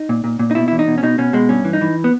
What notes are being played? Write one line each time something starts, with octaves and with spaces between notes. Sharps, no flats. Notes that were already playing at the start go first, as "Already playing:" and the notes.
Already playing: D#4
A#2
A#2
A#2
D#4
B2 E4
E2 E4
D#4
B2
C#4
B2 D#4
B2 C#4
B2 G#3
G2 C#4
E3
D#4
E3
B3